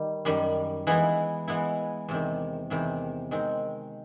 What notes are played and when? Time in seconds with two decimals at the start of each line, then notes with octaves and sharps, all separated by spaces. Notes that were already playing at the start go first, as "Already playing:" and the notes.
Already playing: D#3 G3
0.25 F#2 D#3 G3
0.87 E3 G#3 B3 E4
1.48 E3 G#3 B3 E4
2.09 E2 C3 D#3
2.70 E2 C3 D#3
3.31 D#3 G#3 C4